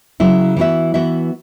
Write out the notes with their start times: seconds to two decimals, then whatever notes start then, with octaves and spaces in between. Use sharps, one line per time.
0.20 C#3 F#3 E4
0.57 E3 B3 F#4 E5
0.94 E3 B3 F#4 E5